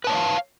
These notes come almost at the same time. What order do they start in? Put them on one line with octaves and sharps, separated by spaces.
B4 A5 C#5 D#5 F5